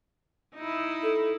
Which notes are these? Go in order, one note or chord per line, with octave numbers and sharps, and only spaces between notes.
D#4 E4
A4